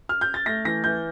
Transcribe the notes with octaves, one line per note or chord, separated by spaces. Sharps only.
F6
G6
A6
A3 A#6
E3 A#6
E3 G6